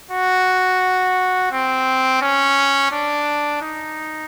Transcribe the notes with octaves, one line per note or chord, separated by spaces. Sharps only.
F#4
C4
C#4
D4
D#4